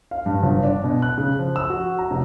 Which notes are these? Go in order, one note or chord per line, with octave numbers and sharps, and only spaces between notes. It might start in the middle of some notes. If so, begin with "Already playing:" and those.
F5
G2
G1
D4
B2
F#6
C#3
F3
E6
F#4
A#5
F1